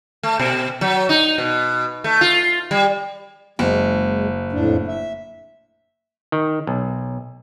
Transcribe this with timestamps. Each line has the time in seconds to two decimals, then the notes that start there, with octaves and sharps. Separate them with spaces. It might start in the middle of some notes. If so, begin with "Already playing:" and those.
0.23 A3
0.40 B2
0.81 F#3
1.09 D#4
1.38 B2
2.04 A3
2.21 F4
2.71 G3
3.59 F#1 G#3
4.52 F2 A2 D4
4.87 E5
6.32 D#3
6.67 B1